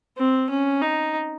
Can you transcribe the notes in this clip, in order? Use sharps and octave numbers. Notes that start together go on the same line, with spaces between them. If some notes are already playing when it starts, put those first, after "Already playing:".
C4
C#4
D#4